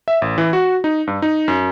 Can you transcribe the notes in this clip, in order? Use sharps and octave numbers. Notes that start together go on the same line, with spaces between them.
E5
A1
E3
F#4
D#4
G2
D#4
F#2